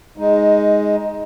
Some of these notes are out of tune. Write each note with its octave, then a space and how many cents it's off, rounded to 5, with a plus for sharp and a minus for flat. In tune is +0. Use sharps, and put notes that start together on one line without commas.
G#3 +0 D#4 +15